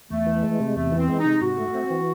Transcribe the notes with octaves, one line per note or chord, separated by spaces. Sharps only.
E2 A3
E3
G#3
C3
E2 A3
E3
C4
G#3
D#4
C3
G#2 F#4
A3
C4
E3